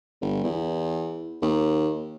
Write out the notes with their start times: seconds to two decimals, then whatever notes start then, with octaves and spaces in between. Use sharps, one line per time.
0.21 G1
0.44 E2
1.42 D#2